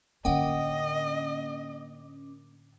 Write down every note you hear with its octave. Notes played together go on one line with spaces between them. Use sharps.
A2 D3 A#3 C#4 D#5 F#5 G5 D6